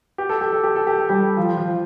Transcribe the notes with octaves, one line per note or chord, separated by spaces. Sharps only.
G4
A4
G4
A4
G4
A4
G4
A4
G3 G4
F3 F4
F3 F4